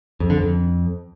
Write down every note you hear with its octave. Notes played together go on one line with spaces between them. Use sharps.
F2
D3
F2